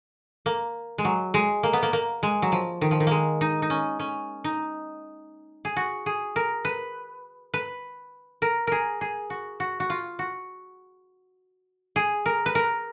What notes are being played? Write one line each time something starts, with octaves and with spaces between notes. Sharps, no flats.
A#3
G#3
F#3
G#3
A#3
B3
A#3
A#3
G#3
F#3
F3
D#3
F3
D#3
G#3 A#3
D#4
D#4
C#4
C#4
D#4
G#4
F#4
G#4
A#4
B4
B4
A#4
G#4 A#4
G#4
F#4
F#4
F#4
F4
F#4
G#4
A#4
B4
A#4